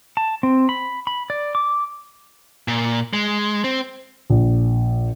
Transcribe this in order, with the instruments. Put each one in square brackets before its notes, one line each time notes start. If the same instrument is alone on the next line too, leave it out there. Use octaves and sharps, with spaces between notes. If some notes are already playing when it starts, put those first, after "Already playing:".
[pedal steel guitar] A5
C4
B5
B5
D5
D6
[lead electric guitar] A#2
G#3
C4
[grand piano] A#1